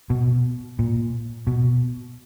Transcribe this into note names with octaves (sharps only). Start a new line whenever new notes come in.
B2
A#2
B2